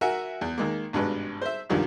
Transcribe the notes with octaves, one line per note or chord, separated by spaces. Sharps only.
F#4 A#4 E5 F#5 G#5
E2
D#3 G#3 A#3
G#1 G2 B2 G#3 B4
C5 E5
C2 G2 D#3 F3 G#3